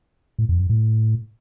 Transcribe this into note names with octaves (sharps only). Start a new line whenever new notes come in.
A2
F2
F#2
A2